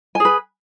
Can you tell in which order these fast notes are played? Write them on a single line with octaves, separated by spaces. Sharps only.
G#5 G#4 B4